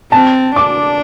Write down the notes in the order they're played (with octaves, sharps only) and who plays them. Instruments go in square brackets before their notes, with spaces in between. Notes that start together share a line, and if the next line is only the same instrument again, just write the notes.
[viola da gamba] C4 [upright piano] A5
[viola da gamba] D4 [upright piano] D6